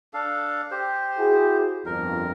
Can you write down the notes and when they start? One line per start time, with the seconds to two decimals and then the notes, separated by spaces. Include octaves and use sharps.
0.14 D4 A4 F5
0.71 G4 C5
1.17 E4 F#4 G#4
1.86 G1 F2 A#4